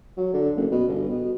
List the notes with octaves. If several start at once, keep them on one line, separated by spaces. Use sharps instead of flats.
F#3
D3
F#1
B2
G1
B2